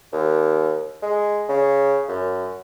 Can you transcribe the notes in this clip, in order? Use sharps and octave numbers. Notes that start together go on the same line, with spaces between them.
D#2
G#3
C#3
F#2